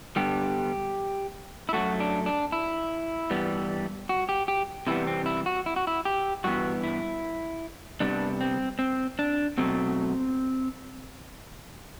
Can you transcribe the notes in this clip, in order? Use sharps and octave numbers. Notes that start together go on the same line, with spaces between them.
G2 D3 G3 B3 G4
E4
F#2 F#3 A3 F#4
D4
D4
E4
G2 E3 G3 B3
F#4
G4
G4
C3 E3 G3 B3 E4
C4
E4
F#4
E4
F#4
E4
G4
G2 E3 B3 F#4
E4
C3 G3 B3 D4
C4
C4
D4
B2 F#3 A3 C4